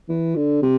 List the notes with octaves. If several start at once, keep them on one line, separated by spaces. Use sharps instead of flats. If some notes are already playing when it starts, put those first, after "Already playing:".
E3
D3
C3